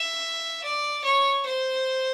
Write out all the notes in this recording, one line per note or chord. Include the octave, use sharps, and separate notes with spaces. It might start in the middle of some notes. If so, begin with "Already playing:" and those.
Already playing: E5
D5
C#5
C5